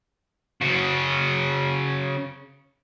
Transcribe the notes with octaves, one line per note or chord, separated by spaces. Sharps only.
C#3 F#4